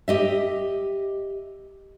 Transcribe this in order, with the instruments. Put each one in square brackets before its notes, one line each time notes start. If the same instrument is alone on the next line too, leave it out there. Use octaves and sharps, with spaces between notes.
[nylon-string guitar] G4 D#5 E5